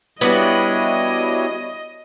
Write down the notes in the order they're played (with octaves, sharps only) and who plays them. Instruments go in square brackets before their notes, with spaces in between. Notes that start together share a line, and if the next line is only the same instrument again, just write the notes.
[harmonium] G3 E4 C#5 [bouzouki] B3 D4 F#4 [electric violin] D#5